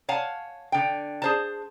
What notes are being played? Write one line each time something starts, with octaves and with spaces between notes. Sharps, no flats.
C#5 F5 F#5 G#5 A5
D3 G5
G#4 C5 A5